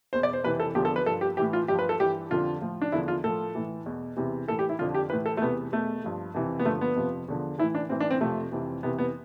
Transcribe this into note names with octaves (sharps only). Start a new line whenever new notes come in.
E2 B2 C5
D5
C5
F2 C3 E3 B4
A4
E2 D3 F3 G4
A4
B4
G2 F3 A4
G4
A2 E3 G4
F4
G2 F3 G4
B4
A4
G2 E3 G4
F2 D3 F3 F4
A2 F3
D4
E2 D3 F3 E4
F4
A2 F3 A4
A2 E3
E2 B2
E2 C3 E3
A2 E3 A4
G4
E4
F2 D3 F3 F4
G4
A2 E3 B4
A4
A3
E2 C3 E3 B3
E2 B2 A3
G2 F3
F2 C3 E3
B3
G2 D3 F3 A3
B3
F2 C3 F3
E2 D3 F3
A2 E3 E4
D4
A2 E3 C4
D4
C4
F2 C3 F3 A3
F2 C3 E3
F2 C3 E3 B3
B3